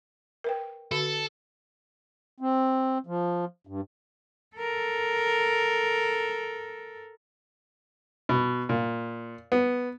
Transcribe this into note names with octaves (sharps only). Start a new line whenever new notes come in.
A#4 B4 G5
D3 F#4 A4
C4
F3
G2
A4 A#4
B2
A#2
B3